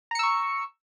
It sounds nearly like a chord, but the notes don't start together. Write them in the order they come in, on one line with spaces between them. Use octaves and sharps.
A#5 C#7 E6 C#6